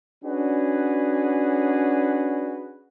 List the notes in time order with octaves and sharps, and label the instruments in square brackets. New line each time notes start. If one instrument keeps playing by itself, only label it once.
[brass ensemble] C#4 D4 F#4 G#4 B4